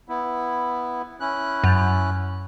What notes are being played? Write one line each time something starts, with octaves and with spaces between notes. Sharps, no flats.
B3 E4
C#4 E4 F#6
F#2